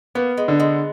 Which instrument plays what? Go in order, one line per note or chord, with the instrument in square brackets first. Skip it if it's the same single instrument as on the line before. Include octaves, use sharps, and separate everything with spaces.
[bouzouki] A#3 [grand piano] B3
[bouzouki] G#3
[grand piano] D3
[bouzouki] G#3